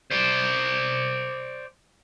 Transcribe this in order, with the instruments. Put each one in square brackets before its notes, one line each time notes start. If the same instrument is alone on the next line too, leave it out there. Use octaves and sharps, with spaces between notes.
[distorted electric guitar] C5 D5